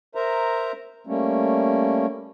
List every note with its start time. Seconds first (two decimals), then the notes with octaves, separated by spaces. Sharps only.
0.15 A#4 C5 E5 A#5
1.07 G3 A3 A#3 C#4